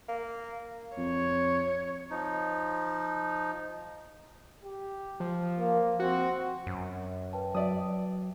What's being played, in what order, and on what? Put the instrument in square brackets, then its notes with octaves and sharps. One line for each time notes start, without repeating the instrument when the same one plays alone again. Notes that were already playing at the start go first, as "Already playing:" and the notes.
[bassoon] A#3
[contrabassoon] F2 [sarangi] C#5
[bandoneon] F3 D#4
[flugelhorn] G4
[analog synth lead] F3
[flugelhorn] A#3
[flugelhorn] C4 [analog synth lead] F#4
[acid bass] F#2
[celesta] B4 G5 A5
[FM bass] F#3 [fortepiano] D5 E5 D#6